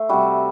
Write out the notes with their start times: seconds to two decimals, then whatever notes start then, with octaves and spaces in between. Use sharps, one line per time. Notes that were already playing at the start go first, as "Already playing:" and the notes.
Already playing: A3 C5
0.09 C3 G3 F#4